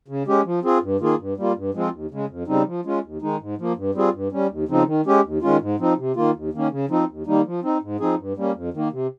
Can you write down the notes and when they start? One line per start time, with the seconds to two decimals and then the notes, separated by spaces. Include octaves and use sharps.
0.08 C#3
0.27 G#3 C#4 G4
0.45 F3
0.63 C4 F4 G#4
0.82 G2
1.00 D#3 A#3 F4 G#4
1.19 G2
1.37 G3 A#3 F4
1.56 G2
1.74 F3 G#3 C4 F4
1.92 D#2
2.11 C#3 G#3
2.29 F2
2.47 C#3 G3 C4 D#4
2.66 F3
2.85 G#3 C#4 F4
3.03 D#2
3.22 D#3 G#3 D#4
3.40 G#2
3.58 F3 A#3
3.76 G2
3.94 G3 C4 F4 G#4
4.13 G2
4.32 G3 C#4
4.50 D#2
4.68 C#3 F3 C4 D#4
4.86 D#3
5.06 G#3 C#4 G4
5.24 D#2
5.42 D#3 G#3 C#4 F4
5.61 G#2
5.79 F3 C4 D#4
5.97 C3
6.16 D#3 A#3 F4
6.35 D#2
6.53 D#3 A#3 C#4
6.71 C#3
6.89 F3 C4 D#4
7.08 D#2
7.27 D#3 G3 A#3 D#4
7.45 F3
7.63 C4 D#4
7.82 G#2
8.00 F3 C4 D#4 G#4
8.18 G2
8.37 G3 A#3 C#4
8.55 F2
8.74 D#3 A#3
8.92 C3